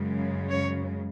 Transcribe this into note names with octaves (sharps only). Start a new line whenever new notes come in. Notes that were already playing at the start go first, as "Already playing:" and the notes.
Already playing: F#2 C#3 G#3
C#5